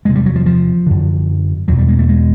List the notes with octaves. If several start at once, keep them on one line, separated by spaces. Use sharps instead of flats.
E2 C3 G#3
G3
F#3
F3
F3
F#2 D3
E2 B2 F#3
G3
G#3
A3
G#3